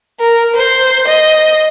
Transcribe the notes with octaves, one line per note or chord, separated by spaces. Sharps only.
A#4
C5
D#5